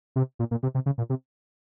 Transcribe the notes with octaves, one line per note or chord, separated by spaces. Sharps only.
C3
A#2
A#2
C3
C3
C#3
A#2
C3